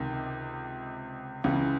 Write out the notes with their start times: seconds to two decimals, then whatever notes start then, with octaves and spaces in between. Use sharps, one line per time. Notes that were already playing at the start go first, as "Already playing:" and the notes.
Already playing: C#2 C3 D#3
1.44 C#2 C#3 E3